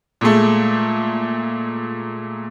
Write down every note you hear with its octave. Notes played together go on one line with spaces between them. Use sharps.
A#2 G#3 A3